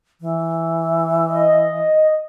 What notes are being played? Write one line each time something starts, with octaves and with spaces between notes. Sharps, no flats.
E3
D#5